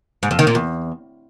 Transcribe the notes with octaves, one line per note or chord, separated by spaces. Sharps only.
G#2
F2
D#3
A#2
E2